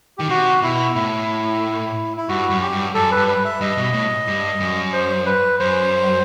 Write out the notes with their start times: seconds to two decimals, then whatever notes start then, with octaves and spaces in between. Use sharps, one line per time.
0.18 D#3 G4
0.29 C3 F#4
0.62 B2 E4
0.95 A2 E4
2.17 E4
2.28 G2 F#4
2.50 F#2
2.62 G4
2.73 G2
2.95 F#2 A4
3.11 B4
3.17 G2
3.28 B4
3.45 E5
3.61 G2 D#5
3.77 B2
3.93 A2
4.27 G2
4.60 F#2
4.93 C5
5.26 B4
5.59 F#2 C5